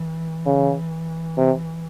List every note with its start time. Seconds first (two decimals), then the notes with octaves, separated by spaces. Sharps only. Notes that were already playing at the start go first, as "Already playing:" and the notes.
Already playing: E3
0.46 C#3
1.38 C3